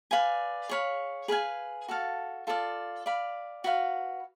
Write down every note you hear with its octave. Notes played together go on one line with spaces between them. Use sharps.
B4 D5 F5 G#5
G#4 C#5 F5 B5
G#4 B4 F5 G#5
F#4 A4 F5 A5
F4 A4 D5 F5
D5 F5 B5
F#4 B4 F5